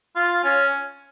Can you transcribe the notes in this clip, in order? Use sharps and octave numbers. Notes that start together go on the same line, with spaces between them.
F4
C#4